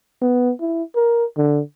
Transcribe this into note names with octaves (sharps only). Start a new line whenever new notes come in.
B3
E4
A#4
D3